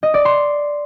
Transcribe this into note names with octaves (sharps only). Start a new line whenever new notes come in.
D#5
D5
C6